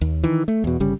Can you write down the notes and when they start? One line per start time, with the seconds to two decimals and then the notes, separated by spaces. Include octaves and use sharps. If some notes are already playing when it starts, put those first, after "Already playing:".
0.01 D#2
0.24 D#3 E3
0.48 A3
0.64 E2 B2
0.80 G1 C#3 G3